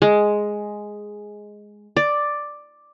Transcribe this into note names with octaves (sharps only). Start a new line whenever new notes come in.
G#3
D5